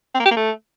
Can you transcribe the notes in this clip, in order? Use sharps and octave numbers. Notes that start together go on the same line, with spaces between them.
C4
A#3
G4
A#3
A3